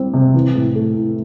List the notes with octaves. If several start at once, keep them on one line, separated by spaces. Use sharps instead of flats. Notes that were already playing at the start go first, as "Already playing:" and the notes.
Already playing: G3 C4 E4
C3
E3
A2
A3
A2